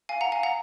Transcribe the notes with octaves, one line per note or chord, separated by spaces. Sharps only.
F5 G#5
F#5 A#5
F5 G#5
F#5 A#5